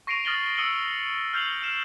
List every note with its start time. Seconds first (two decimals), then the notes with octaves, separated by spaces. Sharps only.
0.07 C#6 A#6 C7 D7 D#7 F7
0.25 D#6 F6 A6 A#6 F#7 G7
0.56 D#6 E6 C#7 D#7 F#7 G7
1.33 F6 G6 C7 F7 F#7
1.63 F6 E7